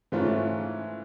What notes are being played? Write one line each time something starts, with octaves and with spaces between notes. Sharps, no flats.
G#2 E3 A3 C#4 F4